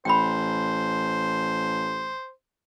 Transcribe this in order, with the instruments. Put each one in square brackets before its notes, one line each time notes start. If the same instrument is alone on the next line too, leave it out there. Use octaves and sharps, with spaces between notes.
[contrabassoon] A1 [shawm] C5 [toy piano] G5 B5